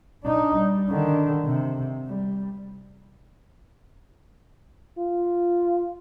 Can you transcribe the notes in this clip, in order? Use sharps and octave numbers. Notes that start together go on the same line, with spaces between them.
D4 D#4
G3
D3 D#3
C3
G3
F4